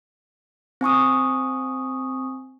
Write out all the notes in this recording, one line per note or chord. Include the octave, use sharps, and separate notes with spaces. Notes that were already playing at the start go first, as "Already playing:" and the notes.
C4 G#5 C#6 D#6